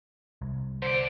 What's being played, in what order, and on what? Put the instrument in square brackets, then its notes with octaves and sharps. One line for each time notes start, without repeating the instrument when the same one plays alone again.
[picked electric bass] C2
[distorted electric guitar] D3 D5 [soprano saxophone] C5